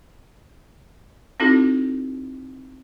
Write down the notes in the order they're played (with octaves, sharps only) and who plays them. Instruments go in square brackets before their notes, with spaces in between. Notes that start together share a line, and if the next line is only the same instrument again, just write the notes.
[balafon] C4 D#4 E4 F#4 A4